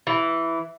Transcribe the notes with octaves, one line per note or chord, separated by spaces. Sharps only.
E3